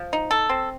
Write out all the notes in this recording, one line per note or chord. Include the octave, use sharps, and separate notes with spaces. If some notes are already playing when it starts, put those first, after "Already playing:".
Already playing: F3
D#4
A4
C4